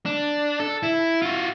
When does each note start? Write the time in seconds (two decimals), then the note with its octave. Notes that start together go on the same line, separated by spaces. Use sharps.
0.06 D4
0.60 A4
0.83 E4
1.22 F4 F#4